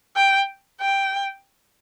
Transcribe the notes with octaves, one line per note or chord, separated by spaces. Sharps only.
G5
G5